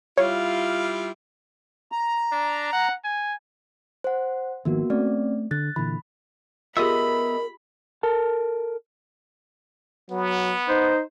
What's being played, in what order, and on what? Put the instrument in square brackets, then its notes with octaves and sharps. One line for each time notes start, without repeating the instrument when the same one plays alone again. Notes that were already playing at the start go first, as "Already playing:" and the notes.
[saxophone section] G3 E4 F4 [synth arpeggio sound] C#5
[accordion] A#5
[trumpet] D4
F#5
G#5
[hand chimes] C5 F#5
[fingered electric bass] G#1 D#3 F3 [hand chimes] A#3 B3 F#4
[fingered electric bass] A3 [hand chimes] C4 C#4 D5
[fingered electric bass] D3 [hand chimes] F#6 A6
[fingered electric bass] A#2 D3 E3 [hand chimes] B5
[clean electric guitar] B3 D#5 E5 [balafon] F4 G4 G#4 [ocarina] A#4 [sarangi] B5
[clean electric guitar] A4 A#4 A5
[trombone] F#3 [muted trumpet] B3
[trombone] D#4 [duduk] C5